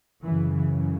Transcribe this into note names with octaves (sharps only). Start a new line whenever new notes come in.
F#2 C#3 E3
E3